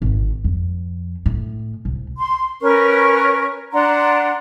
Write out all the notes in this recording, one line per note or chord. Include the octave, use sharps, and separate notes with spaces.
G#1
F2
A2
C2
C6
C#4 A#4 B4 C#6
D4 F#5 A#5 C6